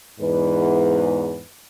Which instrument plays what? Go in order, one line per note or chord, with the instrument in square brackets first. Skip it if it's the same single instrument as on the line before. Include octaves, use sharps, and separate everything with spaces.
[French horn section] E2 G#2 B4